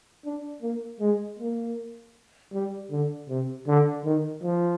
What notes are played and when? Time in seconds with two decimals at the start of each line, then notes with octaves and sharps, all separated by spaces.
0.25 D4
0.62 A#3
1.00 G#3
1.39 A#3
2.53 G3
2.91 D3
3.29 C3
3.68 D3
4.05 D#3
4.43 F3